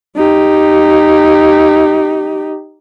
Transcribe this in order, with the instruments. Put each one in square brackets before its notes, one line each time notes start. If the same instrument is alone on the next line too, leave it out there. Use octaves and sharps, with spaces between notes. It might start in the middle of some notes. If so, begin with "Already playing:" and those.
[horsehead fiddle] D#4 G4